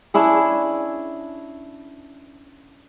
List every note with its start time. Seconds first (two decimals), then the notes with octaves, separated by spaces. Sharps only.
0.14 C#4 D4 E4 G#4